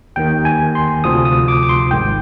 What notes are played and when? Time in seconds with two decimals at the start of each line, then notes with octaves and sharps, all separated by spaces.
0.16 D#2 D#3 G5
0.45 G#5
0.75 C6
1.04 D2 C3 F3 D#6
1.25 D#6
1.48 D6
1.63 D6
1.69 C6
1.91 G#1 G#2 D#3 G5